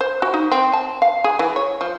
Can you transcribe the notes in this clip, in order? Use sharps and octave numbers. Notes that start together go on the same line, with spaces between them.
C5
F#4
D#4
C4
A5
F5
G#4
E3
C#5
F3